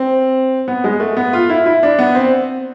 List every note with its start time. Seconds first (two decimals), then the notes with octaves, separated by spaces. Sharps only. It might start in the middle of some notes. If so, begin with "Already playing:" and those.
Already playing: C4
0.68 B3
0.84 G#3
1.00 A3
1.17 B3
1.33 F4
1.50 E4
1.66 E4
1.83 D4
1.99 B3
2.15 C4